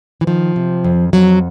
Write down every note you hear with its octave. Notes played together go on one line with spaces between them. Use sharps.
E3
D#3 F3
C3
F2
F2 F#3